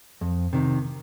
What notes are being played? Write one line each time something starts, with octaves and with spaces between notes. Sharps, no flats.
F2
C3 D#3